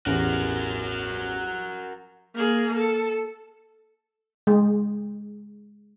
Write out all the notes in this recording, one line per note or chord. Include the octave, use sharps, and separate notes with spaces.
A1 E2 F#4 A#4
A#3 G#4
A4
G#3